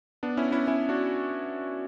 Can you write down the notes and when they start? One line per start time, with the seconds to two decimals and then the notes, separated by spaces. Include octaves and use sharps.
0.23 B3 D4
0.37 C#4 E4
0.52 C#4 E4
0.67 C#4 E4
0.89 D4 F#4